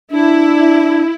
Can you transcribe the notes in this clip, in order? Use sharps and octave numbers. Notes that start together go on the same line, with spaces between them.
D4 E4